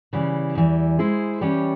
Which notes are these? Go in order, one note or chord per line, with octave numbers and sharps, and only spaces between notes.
C#3 E3 G3
E2 E3 G3
G#3 E4 G#4 C5
E3 G3 C#4 G4 C#5